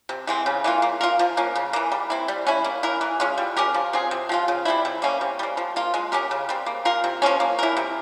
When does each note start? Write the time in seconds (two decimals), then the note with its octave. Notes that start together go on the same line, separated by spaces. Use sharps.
0.09 C3
0.27 E3 G#3 C4
0.46 C#3
0.64 E3 A#3 F4
0.82 A#3
1.01 F4 A#4
1.19 F3
1.37 A#3 C#4
1.56 C#3
1.73 E3 A#3
1.92 G3
2.10 C4 E4
2.28 G3
2.47 C#4 E4
2.64 A#3
2.83 E4 A#4
3.01 E3
3.20 G#3 C#4 F4
3.38 G3
3.57 C#4 G4 A#4
3.74 F3
3.93 C4 F4 G#4
4.11 C3
4.29 F3 C4 F4
4.48 C#3
4.65 G3 C4 E4
4.85 C3
5.02 G3 A#3 C#4
5.21 C3
5.39 G3 A#3
5.57 F3
5.76 A#3 F4
5.94 G#3
6.12 C#4 G4 A#4
6.31 C#3
6.49 G3 C4
6.66 A#3
6.85 F4 A#4
7.04 C3
7.22 F3 A#3 C#4
7.40 A#3
7.59 E4 A#4
7.77 C3